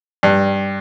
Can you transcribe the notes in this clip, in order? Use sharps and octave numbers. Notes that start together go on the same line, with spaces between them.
G2